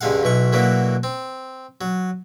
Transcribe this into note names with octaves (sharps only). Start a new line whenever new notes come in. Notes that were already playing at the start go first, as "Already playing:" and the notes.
C#2 G2 D3 G#3 F5 F#5
B1 B2 E3 C#6
B2 D3 E3 F#3 A#3
C4
F#3